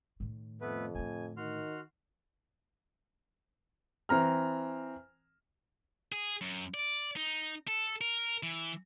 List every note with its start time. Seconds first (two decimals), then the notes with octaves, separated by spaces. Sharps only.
0.20 A2 D#3
0.61 F2 A3 B3 B4
0.95 A2 D3 G#5
1.37 D#3 F#4 C6 F6
4.09 E3 C4 A#5 F6
6.12 G#4
6.41 F#2
6.74 D5
7.16 D#4
7.68 A4
8.01 A#4
8.43 E3